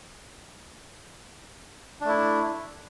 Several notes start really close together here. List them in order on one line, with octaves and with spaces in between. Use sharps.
D4 A3 E4